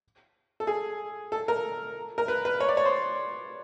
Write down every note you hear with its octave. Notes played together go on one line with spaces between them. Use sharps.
A4
G#4
A4
A#4
A#4
B4
B4
C#5
D5
C#5
C5